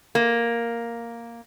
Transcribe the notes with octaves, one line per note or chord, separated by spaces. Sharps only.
A#3